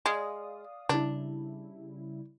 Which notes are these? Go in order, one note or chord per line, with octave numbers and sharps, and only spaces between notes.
G#3 D5 F5 D#6
C#3 G3 D4 E4